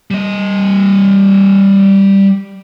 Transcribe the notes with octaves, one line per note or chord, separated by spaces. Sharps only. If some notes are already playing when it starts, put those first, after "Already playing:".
G3 D#5